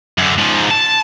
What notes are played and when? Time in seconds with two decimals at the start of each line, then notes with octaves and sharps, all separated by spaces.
0.18 F#2 D3
0.38 G#2 F3
0.71 A5